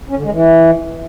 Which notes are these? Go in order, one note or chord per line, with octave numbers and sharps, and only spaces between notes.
C#4
D3
G#3
E3